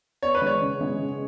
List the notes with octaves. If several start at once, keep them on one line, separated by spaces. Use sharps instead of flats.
B3 C#5
B4
G#3 C#5
C#3
G#3
C#3